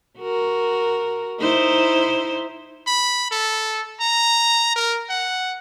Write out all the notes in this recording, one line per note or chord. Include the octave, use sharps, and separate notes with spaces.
F#4 A#4
D#4 E4 C5
B5
A4
A#5
A#4
F#5